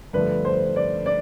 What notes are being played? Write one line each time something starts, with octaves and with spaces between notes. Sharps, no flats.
G2 D3 F3 A3 B4
C5
D5
D5